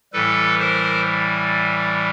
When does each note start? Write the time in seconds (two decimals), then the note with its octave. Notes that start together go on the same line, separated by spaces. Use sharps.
0.13 A2 E3 G3 A4 B4
0.59 A#4 C5